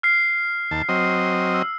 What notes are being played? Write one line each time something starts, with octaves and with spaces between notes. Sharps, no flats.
F6 C7
D#2 A5
F#3 C4 D#5
E6